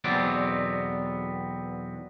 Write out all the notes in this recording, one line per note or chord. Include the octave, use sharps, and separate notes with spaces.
B1 E2 F#3 B3 C4 D5